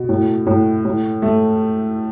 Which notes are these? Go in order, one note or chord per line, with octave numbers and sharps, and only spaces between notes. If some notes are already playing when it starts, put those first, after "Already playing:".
Already playing: B2
A2
A2
A2
A3